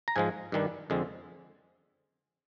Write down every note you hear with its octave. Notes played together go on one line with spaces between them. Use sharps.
A#5
G#2 F3 G#3 G#5
G2 D#3 G3 D4
F2 D3 G#3 C4